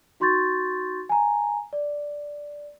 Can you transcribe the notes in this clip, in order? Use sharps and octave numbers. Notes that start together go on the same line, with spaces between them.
D#4 F#4 C6 C#6 G6 A6
G#5 A#5
D5